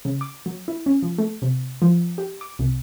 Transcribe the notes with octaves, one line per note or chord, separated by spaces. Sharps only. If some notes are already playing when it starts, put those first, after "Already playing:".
C#3
D6
F#3
E4
C#4
F3
A3
C3
F3
G4
D6
C2